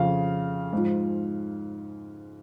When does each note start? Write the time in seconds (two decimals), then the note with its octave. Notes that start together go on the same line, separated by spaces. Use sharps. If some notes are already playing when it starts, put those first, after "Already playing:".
Already playing: F2 C#3 F3 F5
0.72 G#2 F3